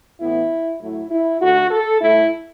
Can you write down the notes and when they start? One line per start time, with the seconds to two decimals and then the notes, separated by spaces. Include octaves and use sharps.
0.20 A2 E3 B3 E4
0.80 A2 F#3 A3 E4
1.11 E4
1.41 D3 A3 F#4
1.71 A4
2.01 A2 A3 E4